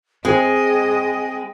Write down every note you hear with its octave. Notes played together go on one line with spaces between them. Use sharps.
G#3 C4 G#4 D#5 G5